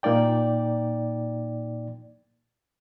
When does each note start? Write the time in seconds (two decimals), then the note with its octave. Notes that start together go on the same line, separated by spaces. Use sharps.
0.03 A#2 A#3 D#4 D5 G5